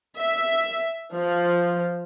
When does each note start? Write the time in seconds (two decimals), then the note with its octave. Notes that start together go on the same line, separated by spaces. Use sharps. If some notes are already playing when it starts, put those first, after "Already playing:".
0.17 E5
1.15 F3